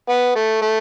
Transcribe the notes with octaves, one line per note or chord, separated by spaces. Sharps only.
B3
A3
A3